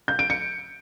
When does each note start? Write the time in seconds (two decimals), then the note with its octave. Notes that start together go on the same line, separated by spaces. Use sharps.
0.08 G6
0.19 D7
0.30 C#7